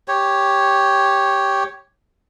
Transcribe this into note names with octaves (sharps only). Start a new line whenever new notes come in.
G4 C#5